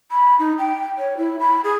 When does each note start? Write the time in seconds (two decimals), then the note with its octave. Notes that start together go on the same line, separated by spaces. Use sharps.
0.11 B5
0.39 D#4
0.58 G5
0.98 C#5
1.17 E4
1.40 B5
1.64 G#4